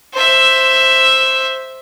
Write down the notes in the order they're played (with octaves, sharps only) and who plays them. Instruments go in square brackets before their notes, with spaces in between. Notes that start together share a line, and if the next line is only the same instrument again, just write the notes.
[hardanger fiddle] C5 E5